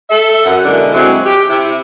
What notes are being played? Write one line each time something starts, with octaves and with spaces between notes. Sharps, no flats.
A4 E5
F#2 F#5
B2 D3 G#3 D4 E4 A#4
D3 F#3 G#3 C4 E4
G4
C3 E4